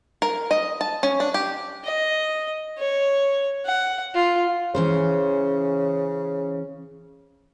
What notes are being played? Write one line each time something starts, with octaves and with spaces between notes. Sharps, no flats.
A#4
D#5
A5
C#4
D4
G4
D#5
C#5
F#5
F4
C#3 E3 C#4 C5